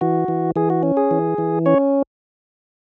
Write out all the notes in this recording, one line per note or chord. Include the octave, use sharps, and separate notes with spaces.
E3 F#4
E3
E3 G#4
F#4
C#4
G#4
E3
E3
C#4 C#5